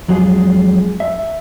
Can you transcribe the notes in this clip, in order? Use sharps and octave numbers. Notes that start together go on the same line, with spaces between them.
F2 F#3 G#3 F4 G#4
E5